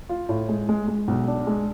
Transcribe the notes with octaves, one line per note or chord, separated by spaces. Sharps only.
F4
A2
G#3
G#3
G#3
B1
D4
G#3